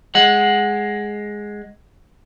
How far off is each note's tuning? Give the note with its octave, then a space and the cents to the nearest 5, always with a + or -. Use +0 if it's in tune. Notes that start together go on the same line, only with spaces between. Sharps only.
G#3 +0 F#5 +0